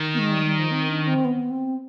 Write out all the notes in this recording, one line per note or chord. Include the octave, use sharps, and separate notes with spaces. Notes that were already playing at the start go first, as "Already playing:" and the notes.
Already playing: D#3
B3
G#3
G3
G3
F3
C4
D4
C4
B3
C4